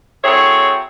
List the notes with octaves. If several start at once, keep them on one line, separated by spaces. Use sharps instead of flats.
F#3 C4 E4 G#4 A4 C#5